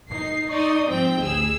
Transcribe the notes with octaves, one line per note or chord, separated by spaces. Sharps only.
D#4 C7
D#4 D5 C6 C#6 D#6
G#2 F3 C4 G5
A1 D2 G#4 E6